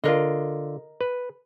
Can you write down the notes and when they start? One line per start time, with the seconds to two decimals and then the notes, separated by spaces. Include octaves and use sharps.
0.04 D3 F4 A#4 D#5
1.01 B4